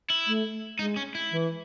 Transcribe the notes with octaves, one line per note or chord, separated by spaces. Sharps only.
E4
A3
G#3 D#4
C#4
E4
E3